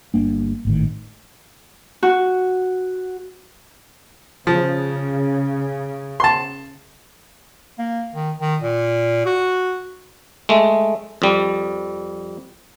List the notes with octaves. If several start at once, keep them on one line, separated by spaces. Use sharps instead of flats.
G1 G2 A#3 D4
G#1 A2 D#3
F#4
C#3 F3
A5 C6
A#3
D#3
D#3
A#2
F#4
G#3 A3
F2 G3